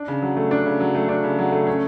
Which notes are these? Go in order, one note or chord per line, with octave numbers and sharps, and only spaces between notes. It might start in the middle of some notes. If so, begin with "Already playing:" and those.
Already playing: D4
C#3
F#3
A3
D4
C#3
F#3
A3
D4
C#3
F#3
A3
C#4